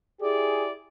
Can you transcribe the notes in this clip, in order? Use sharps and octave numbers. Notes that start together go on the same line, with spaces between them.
E4 G4 G#4 D5